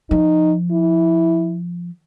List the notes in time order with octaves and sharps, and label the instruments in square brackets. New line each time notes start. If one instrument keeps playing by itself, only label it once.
[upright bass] F3 [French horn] D#4
[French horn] E4